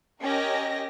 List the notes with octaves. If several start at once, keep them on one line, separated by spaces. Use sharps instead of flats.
C#4 G4 A#4 D#5 A#6